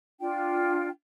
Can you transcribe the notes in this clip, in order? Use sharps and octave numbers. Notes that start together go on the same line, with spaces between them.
D4 F4 G5